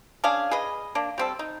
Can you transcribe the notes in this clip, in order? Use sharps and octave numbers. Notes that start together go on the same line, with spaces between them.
C#4 D4 G#4 F5
G#4 B4 D#5
A#3 D4
G3 C4 A4
D#4